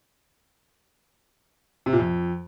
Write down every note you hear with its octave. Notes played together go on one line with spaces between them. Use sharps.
C3
A#2
F2